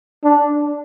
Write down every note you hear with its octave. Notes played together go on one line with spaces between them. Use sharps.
D4